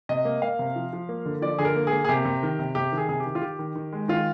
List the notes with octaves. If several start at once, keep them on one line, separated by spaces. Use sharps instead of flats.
C3 D#5
A#3
A#3 F5
C3
F3
F3
A#3
D3
F3 D5
D3 G#4
A#4
A#3
G#4
A#3
G#4
C3 G4
C3
D#3
C3
C3 G4
D#3
G#4
C3 G#4
G4
D#3
F4
D#3 G4
D#3
D#3
G#3
D#3 F4